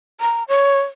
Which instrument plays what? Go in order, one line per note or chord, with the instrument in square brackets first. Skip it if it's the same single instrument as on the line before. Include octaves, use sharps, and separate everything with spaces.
[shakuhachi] A#5
C#5